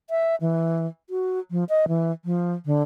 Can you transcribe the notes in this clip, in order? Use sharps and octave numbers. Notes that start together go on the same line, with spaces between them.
E5
E3
F#4
F3
D#5
E3
F3
D3